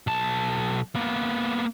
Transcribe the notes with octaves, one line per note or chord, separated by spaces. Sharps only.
B1 A5
A#3 B3